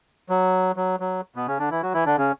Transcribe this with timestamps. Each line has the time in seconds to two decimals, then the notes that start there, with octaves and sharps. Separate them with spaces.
0.29 F#3
0.76 F#3
1.00 F#3
1.36 B2 B3
1.47 C#3 C#4
1.59 D3 D4
1.70 E3 E4
1.82 F#3 F#4
1.94 E3 E4
2.06 D3 D4
2.17 C#3 C#4